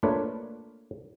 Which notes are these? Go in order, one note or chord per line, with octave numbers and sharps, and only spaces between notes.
A3 A#3 D4 F4 B4 C#5